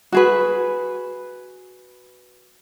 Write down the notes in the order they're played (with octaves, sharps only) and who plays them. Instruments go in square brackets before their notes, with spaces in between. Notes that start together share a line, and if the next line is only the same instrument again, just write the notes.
[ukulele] F#4 G#4 B4